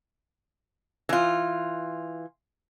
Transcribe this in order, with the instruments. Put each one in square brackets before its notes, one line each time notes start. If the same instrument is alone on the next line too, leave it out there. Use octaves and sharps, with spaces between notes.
[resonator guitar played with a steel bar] E3 F4